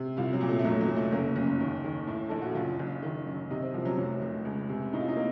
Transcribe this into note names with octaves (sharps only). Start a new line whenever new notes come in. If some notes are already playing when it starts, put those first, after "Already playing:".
Already playing: C3
C2 F4
F#3
A#2
A3
A3
F1 F#3
F#3
F1
A3
F#1 A#3
F#1 C#4
D#2
D#3
A2
A#1 A4
F#4
F#1 F4
F#1
D#3
F#2
C3 D#4
C4
C2 F3
F#3
F1 F#3
F1
C#2
C3
A2 D#4
F4
D#4
A#3